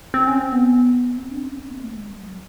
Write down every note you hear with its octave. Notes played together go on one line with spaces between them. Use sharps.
C4
C#4
C4
B3
C4
D4
C#4
C4
A#3
A3
G#3
G3
F#3